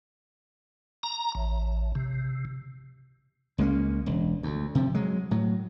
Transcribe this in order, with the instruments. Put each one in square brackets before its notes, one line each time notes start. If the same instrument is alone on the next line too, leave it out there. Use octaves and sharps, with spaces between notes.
[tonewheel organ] A#5
A1
C3
[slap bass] C#2 G#3 A#3 C#4
E1
D2
C3 F3
F#3 G#3
A2 F#3